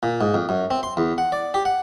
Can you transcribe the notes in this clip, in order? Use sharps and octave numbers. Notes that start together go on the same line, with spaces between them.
A#2
G#2
F2
F#2
C4
C6
E2
F#5
D5
G4
F#5